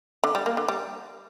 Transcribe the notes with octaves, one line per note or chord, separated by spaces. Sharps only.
D3
G3
A#3
D3
G3